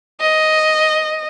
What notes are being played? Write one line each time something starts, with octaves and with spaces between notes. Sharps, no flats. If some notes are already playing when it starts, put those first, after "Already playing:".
D#5